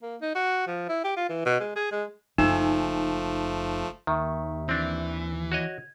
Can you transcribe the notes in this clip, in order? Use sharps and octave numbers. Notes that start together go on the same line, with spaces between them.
A#3
D#4
F#4
F3
E4
G4
F4
E3
B2
G#3
G#4
G#3
F#1 F3 A3 D#4
D#2 D#3 E5 C#6
E3 C4 D4
F#4 C#5 D#5 G#6